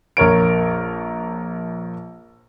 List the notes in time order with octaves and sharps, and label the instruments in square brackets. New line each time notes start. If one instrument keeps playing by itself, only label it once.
[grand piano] A#1 A#4 C#5 D7